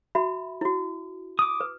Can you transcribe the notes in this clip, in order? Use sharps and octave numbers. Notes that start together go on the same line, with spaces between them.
F#4 E5 B5
E4 F#4
D6 D#6
B4